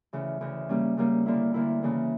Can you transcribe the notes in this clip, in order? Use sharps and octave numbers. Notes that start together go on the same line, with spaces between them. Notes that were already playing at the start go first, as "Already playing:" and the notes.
D2 C#3 E3
D2 C#3 E3
C#3 G3 A#3 C#4
C#3 G3 A#3 C#4
D2 D3 A#3 E4
D2 D3 A#3 E4
C#3 E3 A#3